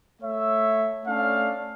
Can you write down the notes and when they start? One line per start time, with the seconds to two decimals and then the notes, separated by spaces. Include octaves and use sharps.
0.22 A3 C#5 E5
1.06 A3 C#4 D4 A4 F5